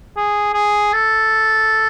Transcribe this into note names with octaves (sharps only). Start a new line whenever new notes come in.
G#4
G#4
A4